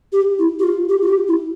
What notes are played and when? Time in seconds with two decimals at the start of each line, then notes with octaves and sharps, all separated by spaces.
0.13 G4
0.39 E4
0.59 G4
0.64 F4
0.89 G4
1.02 F4
1.08 G4
1.28 E4